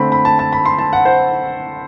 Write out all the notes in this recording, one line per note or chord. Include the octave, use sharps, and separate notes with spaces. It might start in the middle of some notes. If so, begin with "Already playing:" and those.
Already playing: D3 A3 C4 B5
B5
A5
A5
B5
C6
A5
F#5
C5